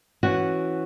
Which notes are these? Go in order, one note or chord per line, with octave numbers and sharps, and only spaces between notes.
E3 C#4 F#4